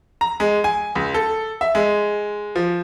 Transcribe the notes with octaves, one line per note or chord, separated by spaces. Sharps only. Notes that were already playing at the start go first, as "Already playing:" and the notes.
A#5
G#3
G#5
C#2
A4
E5
G#3
F3